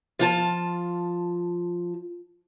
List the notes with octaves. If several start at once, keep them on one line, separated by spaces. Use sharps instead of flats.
F3 F4 A5